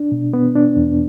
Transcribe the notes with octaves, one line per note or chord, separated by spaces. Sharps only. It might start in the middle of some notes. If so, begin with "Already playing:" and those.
Already playing: D4
B2
B3
D4
E2